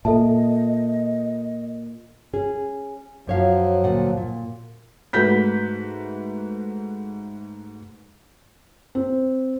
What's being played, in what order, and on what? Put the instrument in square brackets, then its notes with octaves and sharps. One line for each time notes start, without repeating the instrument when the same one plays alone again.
[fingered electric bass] A#2 [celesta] A4 E5 A5 [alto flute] D#5
[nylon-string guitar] C#4 G#4
[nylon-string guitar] F#2 C#5 F5 [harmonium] F3 F#3
[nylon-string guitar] D2 A#2 F#5
A#2
[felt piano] G#2 A3 F#4 B4 G6 B6
C4